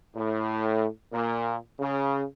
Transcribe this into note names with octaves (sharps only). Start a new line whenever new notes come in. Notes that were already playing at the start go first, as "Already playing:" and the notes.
A2
A#2
C#3